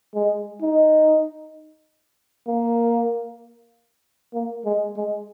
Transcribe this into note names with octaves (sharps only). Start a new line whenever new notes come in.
G#3
D#4
A#3
A#3
G#3
G#3